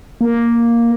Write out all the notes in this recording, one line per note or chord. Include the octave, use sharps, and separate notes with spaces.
A#3